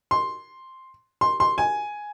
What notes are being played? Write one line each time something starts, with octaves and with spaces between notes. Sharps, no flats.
C6
C6
C6
G#5